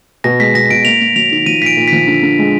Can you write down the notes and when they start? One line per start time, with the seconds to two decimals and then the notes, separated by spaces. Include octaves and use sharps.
0.24 B2 A#6
0.40 G#3 B6
0.54 B2 A#6
0.70 B2 D7
0.85 A#3 F7
1.01 A#3
1.16 F#3 F7
1.31 D#3
1.46 F3 D#7
1.61 A#2 B6
1.66 D7
1.77 A#2
1.88 F3 B6
2.07 D3
2.23 D3
2.39 G#3